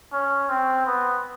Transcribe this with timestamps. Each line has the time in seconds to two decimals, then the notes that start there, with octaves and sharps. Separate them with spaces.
0.13 C#4
0.49 C4
0.87 B3